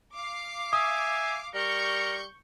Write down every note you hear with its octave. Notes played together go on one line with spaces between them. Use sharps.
F5 D6 C7
E5 G#5 D#6
G3 A#4 C#6 G6 C#7